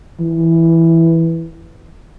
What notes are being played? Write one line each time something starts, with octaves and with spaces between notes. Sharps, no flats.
E3